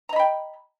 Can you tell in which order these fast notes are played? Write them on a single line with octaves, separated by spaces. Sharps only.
A#5 D#5 B5 G5